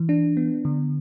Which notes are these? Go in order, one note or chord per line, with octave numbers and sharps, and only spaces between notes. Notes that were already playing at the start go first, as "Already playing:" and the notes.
Already playing: E3
D4
B3
D3